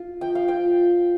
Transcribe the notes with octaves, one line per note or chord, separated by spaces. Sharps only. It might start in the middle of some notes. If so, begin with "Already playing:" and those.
Already playing: F4
F3 G5
F5
F4 G5